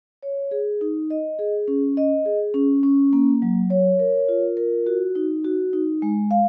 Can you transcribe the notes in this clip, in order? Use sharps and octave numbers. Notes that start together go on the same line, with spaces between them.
C#5
G#4
D#4
D#5
G#4
C#4
D#5
G#4
C#4
C#4
A#3
F#3
C#5
A#4
F4
A#4
F#4
D#4
F#4
D#4
G#3
F5